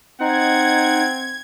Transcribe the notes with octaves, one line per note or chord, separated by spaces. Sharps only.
C4 D#4 F#5 G#6